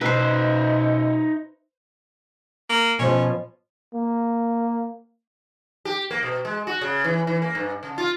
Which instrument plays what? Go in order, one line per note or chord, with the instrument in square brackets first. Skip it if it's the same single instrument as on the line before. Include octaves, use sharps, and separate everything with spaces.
[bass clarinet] B2 [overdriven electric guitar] D#4 E5 [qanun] B4 C5
[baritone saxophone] A#3
[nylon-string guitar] B2 F3 C5 [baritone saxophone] C#4
[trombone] A#3
[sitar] G4
A#3
B2
G#3
F#4
C#3
E3
E3
A#3
G2
C#3
F4